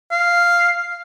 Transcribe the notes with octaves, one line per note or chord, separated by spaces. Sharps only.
F5